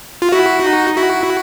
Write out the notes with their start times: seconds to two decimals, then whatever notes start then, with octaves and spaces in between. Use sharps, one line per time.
0.22 F4
0.32 E4 F#4
0.65 D#4
0.96 E4 F#4